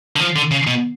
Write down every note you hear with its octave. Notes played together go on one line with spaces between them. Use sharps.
D3
F3
D3
C#3
B2